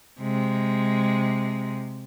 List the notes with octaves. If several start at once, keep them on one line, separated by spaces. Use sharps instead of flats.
C3 G#3